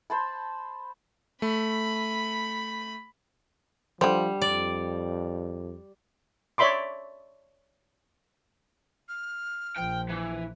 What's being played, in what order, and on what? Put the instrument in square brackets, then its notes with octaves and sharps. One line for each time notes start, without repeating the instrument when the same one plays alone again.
[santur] C5 A5 B5
[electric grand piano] A3 [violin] B5
[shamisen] D3 C5 [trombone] F3 [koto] G3
[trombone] F2 [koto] D5
[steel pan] C#5 D5 E5 B5 C6 D6
[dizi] F6
[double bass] A#1 F3 [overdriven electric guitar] G5
[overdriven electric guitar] E3